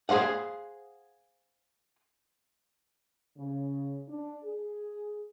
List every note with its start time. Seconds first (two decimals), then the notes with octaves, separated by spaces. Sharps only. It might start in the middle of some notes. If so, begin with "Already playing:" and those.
0.09 G#4 A4 C5 F5 F#5
3.38 C#3
4.08 D4
4.44 G#4